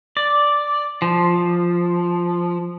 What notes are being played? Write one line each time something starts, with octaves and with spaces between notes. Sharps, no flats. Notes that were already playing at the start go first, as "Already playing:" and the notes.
D5
F3